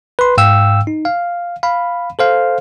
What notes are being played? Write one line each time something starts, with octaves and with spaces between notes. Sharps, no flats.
B4 C6
G#2 F5 G5 E6
D#4
F5
F5 B5
A4 C5 F5